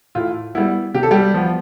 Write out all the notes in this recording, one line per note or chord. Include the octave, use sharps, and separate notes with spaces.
A2 F4
G3 B3 E4
C3 G4
A4
G3 G4
F3 B3